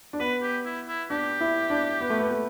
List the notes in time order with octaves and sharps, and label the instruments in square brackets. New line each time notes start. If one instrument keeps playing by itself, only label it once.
[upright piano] D4
[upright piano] B3 [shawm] B4
[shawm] G4
E4
E4
[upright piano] D4 [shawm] G4
[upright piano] E4
D4
B3
A3
B3
A3